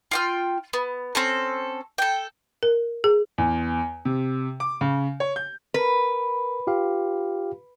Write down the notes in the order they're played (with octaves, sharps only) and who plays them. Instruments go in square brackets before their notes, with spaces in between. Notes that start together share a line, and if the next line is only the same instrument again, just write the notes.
[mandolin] F4 G5 F6
B3
C4 C#4 A4
A4 G5
[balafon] A#4
G#4
[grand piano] E2
C3
D6
C#3
C#5
G6
[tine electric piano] A#4 [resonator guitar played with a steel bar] B4
[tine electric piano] F4 G4 F5